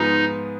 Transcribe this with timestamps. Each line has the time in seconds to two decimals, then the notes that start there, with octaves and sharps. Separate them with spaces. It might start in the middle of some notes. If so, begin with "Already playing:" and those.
Already playing: G#2 F3 B3 D#4 F4 G#4